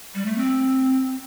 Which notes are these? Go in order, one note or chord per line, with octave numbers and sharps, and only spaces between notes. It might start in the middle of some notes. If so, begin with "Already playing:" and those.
G3
A3
C4